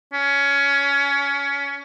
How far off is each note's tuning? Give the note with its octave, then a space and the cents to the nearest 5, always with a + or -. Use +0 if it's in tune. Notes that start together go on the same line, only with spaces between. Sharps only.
C#4 +20